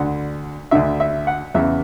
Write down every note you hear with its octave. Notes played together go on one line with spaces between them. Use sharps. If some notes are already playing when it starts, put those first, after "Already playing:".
Already playing: D2 D3 F#5
D2 D3 E5
E5
F#5
E2 C#3 E3 E5